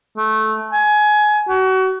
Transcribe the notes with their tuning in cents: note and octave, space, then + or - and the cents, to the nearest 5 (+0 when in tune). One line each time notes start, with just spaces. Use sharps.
A3 -15
G#5 +20
F#4 +30